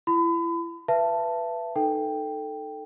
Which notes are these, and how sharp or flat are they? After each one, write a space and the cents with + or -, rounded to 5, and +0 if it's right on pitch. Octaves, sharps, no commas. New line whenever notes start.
E4 +35 B5 +35
B4 +0 E5 +30 A5 +0
D#4 -20 A4 +5 G5 +0